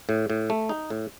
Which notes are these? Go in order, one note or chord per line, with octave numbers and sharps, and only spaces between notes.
A2
A2
A3
D#4
A2